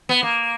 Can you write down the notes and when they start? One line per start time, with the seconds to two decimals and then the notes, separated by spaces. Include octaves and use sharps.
0.09 B3
0.23 A#3